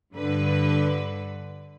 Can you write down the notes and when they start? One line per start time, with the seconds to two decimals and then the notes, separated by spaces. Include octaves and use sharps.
0.14 G2 D3 B4